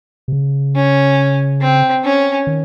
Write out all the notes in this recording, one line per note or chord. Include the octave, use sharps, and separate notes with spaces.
C3
C#3
C#4
C4
C#4
D#3